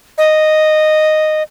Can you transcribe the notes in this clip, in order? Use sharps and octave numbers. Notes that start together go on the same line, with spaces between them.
D#5